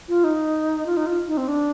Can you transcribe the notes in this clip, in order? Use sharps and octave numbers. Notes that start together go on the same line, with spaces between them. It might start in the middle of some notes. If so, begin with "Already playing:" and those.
F4
D#4
F4
D#4
F4
D#4
C4
D4